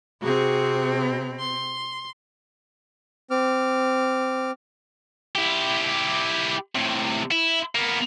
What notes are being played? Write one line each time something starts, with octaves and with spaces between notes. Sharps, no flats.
C3 C4 F#4 G#4
C6
C4 D6 F6
E4 G4
A2 C3
E4
A#3 B3